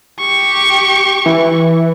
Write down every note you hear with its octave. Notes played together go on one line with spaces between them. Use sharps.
G4 C#6
E3